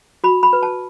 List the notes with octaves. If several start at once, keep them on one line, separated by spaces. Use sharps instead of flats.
F#4 B5
B5
B4
A5